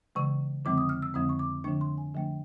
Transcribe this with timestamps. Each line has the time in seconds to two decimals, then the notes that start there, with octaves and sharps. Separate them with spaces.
0.15 C#3 E3 G#3 C#6
0.65 F2 D3 F3 G#3 C4 D6
0.78 D#6
0.89 F6
1.02 E6
1.14 F2 D3 F3 G#3 C4 D#6
1.29 C#6
1.39 D6
1.64 D3 F3 A3 D4 C#6
1.81 C6
1.98 G#5
2.14 D3 F3 A3 D4